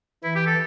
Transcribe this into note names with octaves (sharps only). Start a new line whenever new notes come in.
E3 E4
G4
A4